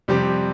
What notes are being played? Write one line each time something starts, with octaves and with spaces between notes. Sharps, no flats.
F2 C3 G3 C4 G4